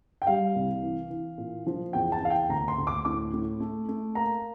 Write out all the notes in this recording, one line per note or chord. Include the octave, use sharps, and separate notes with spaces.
G5
G3 F5
C2
E3
E3
A#2
F3
E2 G5
A5
E2 F5
G5
D2 A#5
C6
D2
D6
A2 D6
A2
A3
A3
A#3 A#5